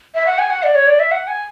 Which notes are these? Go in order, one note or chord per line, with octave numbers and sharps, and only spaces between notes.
E5
F#5
G#5
F#5
D5
C#5
D5
E5
F#5
G#5